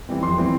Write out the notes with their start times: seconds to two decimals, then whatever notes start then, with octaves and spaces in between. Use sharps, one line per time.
0.09 E3 G3 C4
0.23 F2 C6
0.37 E3 G3 C4